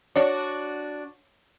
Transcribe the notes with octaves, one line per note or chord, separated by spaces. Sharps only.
D4 F#4 C#5 D5